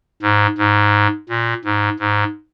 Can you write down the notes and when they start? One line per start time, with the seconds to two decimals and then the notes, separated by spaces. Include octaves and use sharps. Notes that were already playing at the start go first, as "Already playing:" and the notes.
0.22 G#2
0.58 G#2
1.29 A#2
1.64 G#2
1.99 G#2